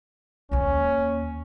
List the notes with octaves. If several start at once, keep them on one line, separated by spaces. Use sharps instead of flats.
D#2 A#3 C#4